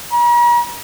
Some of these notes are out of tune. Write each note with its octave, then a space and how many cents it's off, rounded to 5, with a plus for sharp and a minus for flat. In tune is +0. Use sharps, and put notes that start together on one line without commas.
A#5 +45